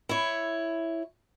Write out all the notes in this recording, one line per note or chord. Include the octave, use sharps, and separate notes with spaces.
E4 C#5